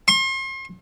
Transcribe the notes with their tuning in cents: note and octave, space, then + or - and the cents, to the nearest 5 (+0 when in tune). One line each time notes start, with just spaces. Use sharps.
C6 +40